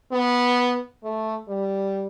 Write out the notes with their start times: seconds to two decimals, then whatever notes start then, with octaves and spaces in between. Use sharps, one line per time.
0.12 B3
1.03 A3
1.48 G3